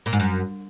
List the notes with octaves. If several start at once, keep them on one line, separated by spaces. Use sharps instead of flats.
A#2
G#2
F#2